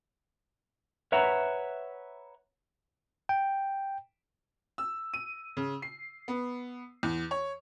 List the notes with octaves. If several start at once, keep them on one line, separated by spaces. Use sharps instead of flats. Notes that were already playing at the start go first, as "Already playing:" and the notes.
B4 C#5 E5 F#5 A#5
G5
E6
D#7
C#3
C7
B3
E2
C#5